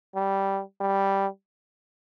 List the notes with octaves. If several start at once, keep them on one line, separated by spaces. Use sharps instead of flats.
G3
G3